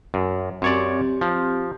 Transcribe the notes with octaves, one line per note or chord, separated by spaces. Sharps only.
F#2
F#2 C4 G4 C#5 D5
F3